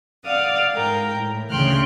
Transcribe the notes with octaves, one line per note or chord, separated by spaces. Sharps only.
D5 F5 F#5 D#6
G#2 A#4 G5 A#5
A2
D2 C#3 G5 C6 F6 F#6